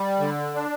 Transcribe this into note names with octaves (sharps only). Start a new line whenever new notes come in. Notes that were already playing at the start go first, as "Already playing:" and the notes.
Already playing: G3
D3
D4